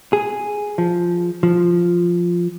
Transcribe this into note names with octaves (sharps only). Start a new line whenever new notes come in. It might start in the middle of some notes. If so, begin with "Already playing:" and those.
G#4
F3
F3